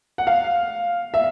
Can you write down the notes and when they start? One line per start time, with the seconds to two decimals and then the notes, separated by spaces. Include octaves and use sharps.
0.18 F#5
0.27 F5
1.14 E5